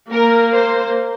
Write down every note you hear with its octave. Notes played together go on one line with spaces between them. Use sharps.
A#3 A#4
C5